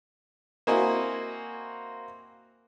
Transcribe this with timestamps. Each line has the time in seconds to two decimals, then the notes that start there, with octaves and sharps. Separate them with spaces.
0.67 A#3 C4 E4 F#4 D#5 G#5